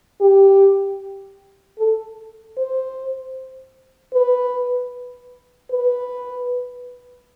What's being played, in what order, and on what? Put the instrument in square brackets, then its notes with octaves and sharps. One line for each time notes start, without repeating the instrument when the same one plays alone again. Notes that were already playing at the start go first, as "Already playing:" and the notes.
[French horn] G4
A4
C5
B4
B4